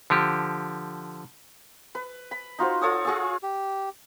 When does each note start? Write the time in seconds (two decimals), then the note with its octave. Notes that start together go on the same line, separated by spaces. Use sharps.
0.10 D3 F3 G4
1.95 B4
2.31 B5
2.59 D#4 F4 F#4 C5
2.81 F4 A4 C#5 D#6
3.05 F4 G#4 C#6 E6
3.43 G4